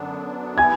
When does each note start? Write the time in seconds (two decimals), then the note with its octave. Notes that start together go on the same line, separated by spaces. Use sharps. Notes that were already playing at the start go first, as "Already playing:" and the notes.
Already playing: F#2 D3 F#3 B3 D4
0.58 B3 E4 G#5 G#6